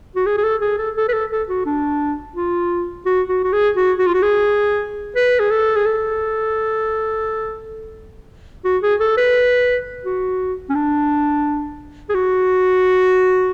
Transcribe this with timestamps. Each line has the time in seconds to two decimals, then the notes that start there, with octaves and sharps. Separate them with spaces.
0.16 F#4
0.27 G#4
0.37 G#4
0.44 A4
0.61 G#4
0.78 A4
0.97 A4
1.09 B4
1.13 A4
1.31 A4
1.49 F#4
1.66 D4
2.36 F4
3.06 F#4
3.29 F#4
3.44 F#4
3.53 G#4
3.76 F#4
3.99 F#4
4.07 F4
4.14 F#4
4.23 G#4
5.16 B4
5.40 G#4
5.51 A4
5.76 G#4
5.86 A4
8.65 F#4
8.83 G#4
9.00 A4
9.17 B4
10.05 F#4
10.70 C#4
10.75 D4
12.09 G#4
12.15 F#4